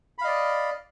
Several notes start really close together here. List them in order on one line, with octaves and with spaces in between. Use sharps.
B5 F5 D#5 D5